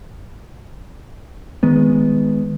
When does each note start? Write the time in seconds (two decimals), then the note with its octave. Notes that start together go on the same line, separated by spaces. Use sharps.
1.63 D#3 G#3 B3